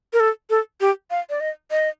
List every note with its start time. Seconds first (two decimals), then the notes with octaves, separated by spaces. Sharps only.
0.13 A#4
0.20 A4
0.50 A4
0.81 G4
1.11 F5
1.30 D5
1.40 D#5
1.71 D#5